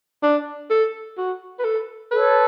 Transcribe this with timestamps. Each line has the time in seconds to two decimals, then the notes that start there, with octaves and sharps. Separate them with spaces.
0.23 D4
0.70 A4
1.18 F#4
1.59 B4
1.65 A4
2.12 A4 B4 C#5